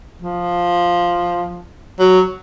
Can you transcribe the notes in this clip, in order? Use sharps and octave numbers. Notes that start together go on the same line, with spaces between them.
F3
F#3